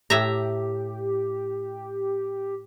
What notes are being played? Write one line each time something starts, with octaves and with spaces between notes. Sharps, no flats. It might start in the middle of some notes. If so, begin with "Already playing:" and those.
A2 G4 E5 A#5